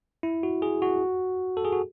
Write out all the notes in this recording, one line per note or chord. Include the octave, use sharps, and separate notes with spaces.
E4
F#4
G#4
F#4
A4
G#4
F#4